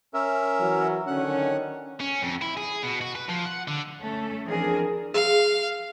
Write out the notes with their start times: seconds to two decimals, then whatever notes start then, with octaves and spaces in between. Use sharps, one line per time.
0.14 C#4 A#4 E5
0.59 E3 F#3
1.07 D3 D#3 C#4 F#5
2.00 C#4
2.22 F2
2.42 E4
2.57 G#4
2.83 B2
3.01 F#4
3.15 B4
3.29 F3
3.46 F#5
3.68 D3
4.01 A3 C#4 A4
4.45 E3 F3 C4 D4 G#4 A#4
5.14 G#4 F5